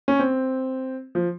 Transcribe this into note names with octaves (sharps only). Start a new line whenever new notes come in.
C#4
C4
F3